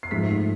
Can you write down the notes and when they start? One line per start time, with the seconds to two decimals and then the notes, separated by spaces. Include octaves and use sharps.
0.03 C7
0.11 G#2 F3 A3 B6